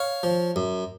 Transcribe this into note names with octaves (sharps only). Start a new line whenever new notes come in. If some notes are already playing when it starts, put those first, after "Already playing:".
Already playing: C#5 F5
F3
F#2